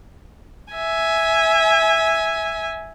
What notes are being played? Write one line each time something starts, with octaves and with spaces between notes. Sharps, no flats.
E5 G#5